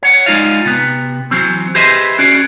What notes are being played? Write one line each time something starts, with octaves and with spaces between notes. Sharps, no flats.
C#5 F#5
G#3 D#4 F4 D5 D#5 F5
C3 B3
E3 F#3 C4
G4 G#4 B4 C5 D#5 E5
C#4 F#4 G#4 D5